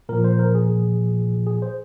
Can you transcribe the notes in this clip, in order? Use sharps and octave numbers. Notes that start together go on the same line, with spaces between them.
A#2 F3 A#4
C5
A#4
G#4
G#4
C5